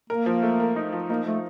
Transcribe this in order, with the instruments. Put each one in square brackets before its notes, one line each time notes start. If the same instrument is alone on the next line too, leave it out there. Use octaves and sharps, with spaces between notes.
[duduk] A#3 [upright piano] A#4
[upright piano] F3
A3
A#4
D#4
F3
[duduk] A#3 [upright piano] D#4
[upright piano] F3 [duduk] A3